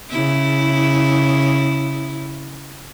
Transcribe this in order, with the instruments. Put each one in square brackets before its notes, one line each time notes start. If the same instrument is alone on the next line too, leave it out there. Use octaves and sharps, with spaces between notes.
[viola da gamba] C#3 E4